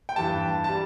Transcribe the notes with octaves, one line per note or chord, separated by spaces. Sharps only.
G5
G2 E3 G3 A5
G3 A5